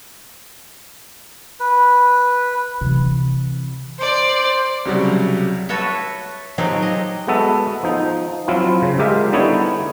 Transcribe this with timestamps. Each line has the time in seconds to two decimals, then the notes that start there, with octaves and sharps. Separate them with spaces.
1.60 B4
2.81 C3 E3
3.98 C5 D5
4.85 C2 C#3 F#3 G3 F#4 F#5
5.69 F#4 A4 B4 C#5 E5
6.58 F3 F#3 C4 D#4 G4 G#4
6.82 D#5
7.28 G#3 B3 F#4 A4 E5
7.83 F3 D#4
8.48 F3 F#3 C4 E4 F4
8.82 C#3
8.98 G#3 F4 G4 A#4 E5
9.32 D3 G3 B3 D#4 E4 C#5